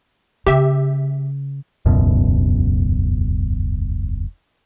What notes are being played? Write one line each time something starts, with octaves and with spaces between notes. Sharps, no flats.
C#3 G4 E5
E1 C#2 F#2 B2